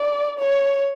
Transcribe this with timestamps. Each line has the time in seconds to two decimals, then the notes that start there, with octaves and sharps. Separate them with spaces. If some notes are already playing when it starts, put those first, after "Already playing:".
Already playing: D5
0.39 C#5